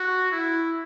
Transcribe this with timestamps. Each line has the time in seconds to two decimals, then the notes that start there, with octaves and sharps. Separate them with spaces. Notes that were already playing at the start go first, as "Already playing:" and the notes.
Already playing: F#4
0.31 E4